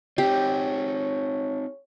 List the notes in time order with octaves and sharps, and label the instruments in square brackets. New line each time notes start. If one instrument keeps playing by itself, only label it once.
[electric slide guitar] C4 D#4 [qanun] G4 [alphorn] C#5